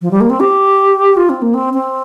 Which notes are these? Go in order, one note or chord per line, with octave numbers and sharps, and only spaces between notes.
F3
G3
A#3
C4
G4
F4
C4
A#3
C4
C4